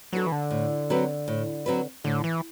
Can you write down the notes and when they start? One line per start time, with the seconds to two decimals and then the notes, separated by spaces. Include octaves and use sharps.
0.13 F#3 B3 D4 F#4 A4
0.26 E3
0.32 D3
0.51 A2
0.90 F#3 C4 F#4 B4
1.28 A2
1.66 F#3 C4 F#4 B4
2.04 A2 D3
2.24 E3